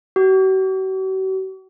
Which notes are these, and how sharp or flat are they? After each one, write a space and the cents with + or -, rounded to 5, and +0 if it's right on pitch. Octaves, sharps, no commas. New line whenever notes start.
F#4 +45